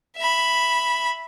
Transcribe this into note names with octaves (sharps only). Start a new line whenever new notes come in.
E5 B5